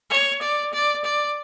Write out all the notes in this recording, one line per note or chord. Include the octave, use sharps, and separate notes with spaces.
C#5
D5
D5
D5